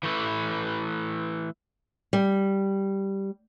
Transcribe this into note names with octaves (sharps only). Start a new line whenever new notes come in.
E3 A3 B4
G3